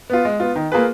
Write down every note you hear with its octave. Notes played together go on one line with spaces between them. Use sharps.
B3 F4
G#3
B3 F4
D#3
A#3 F4 G#4 B4